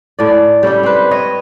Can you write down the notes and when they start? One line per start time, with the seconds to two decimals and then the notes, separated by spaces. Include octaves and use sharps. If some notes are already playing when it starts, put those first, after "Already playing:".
0.19 A2 D5
0.63 G3 C#4 E4 G4
0.83 C4 B4
1.11 C#5 D#5